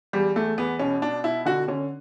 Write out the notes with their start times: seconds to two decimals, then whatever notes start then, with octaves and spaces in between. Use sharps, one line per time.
0.13 E2 G3
0.36 E2 A3
0.58 E2 B3
0.79 B2 C#4
1.02 B2 D4
1.24 B2 E4
1.45 D3 F#4
1.68 D3 C#4